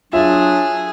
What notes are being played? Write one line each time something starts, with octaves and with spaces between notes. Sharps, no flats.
F#3 D4 F4 G#4 E5